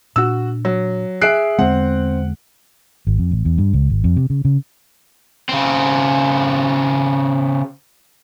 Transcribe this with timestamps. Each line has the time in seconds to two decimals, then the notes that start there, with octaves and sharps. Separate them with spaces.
0.16 A#2 D4 F#4 E6
0.65 F#3
1.21 G#4 E5 F#6 C7 D7
1.59 E2 D3 G#3 C4 F#5
3.07 G#1
3.19 F2
3.32 A1
3.45 E2
3.58 G2
3.74 C#2
3.90 G#1
4.04 F2
4.17 C3
4.30 C#3
4.45 C#3
5.49 C#3 C4